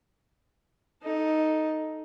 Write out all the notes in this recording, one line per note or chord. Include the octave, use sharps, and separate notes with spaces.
D#4 A4